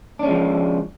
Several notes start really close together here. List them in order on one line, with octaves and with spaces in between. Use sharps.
D4 C#4 G#3 F3